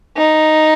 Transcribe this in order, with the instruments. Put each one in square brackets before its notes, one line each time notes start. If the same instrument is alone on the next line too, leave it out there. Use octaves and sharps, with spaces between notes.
[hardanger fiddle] D#4